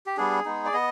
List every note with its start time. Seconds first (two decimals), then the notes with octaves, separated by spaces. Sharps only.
0.06 G4
0.17 G3 B3 D4 G#4
0.45 G#3 B3 D#4
0.66 D5
0.73 B3 D#5